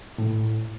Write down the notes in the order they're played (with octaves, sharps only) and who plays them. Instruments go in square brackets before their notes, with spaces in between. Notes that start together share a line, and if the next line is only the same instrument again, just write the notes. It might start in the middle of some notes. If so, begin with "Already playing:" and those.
[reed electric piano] A2